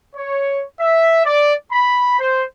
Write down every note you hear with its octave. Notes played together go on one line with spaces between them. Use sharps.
C#5
E5
D5
B5
C5